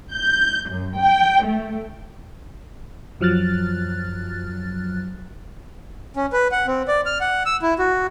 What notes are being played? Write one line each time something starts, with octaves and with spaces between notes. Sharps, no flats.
G6
F#2
G5
A3
F#2 F3 F#3 F6 F#6 A6
C#4
B4
F#5
C4
D5
F6
F#5
E6
E4
F#4